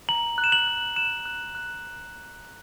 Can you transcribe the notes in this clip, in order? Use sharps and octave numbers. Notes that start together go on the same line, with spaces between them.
A#5 F#7
F#6
E7
F#7
F#6
F#6 E7
F#6
F#6